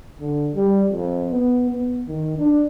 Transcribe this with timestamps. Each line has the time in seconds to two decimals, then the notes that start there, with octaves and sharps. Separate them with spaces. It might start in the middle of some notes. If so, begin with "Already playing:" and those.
0.20 D3
0.56 G3
0.92 F2
1.31 B3
1.71 B3
2.08 D#3
2.38 D4